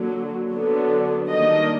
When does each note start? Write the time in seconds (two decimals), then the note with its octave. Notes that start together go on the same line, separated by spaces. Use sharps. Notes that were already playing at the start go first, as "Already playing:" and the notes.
Already playing: D3 F#3 A#3
0.52 D3 F#3 B3 D4
1.29 D#3 G3 A#3 D4 D#5